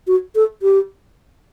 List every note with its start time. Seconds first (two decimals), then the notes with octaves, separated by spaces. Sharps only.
0.07 F#4
0.35 A4
0.62 G4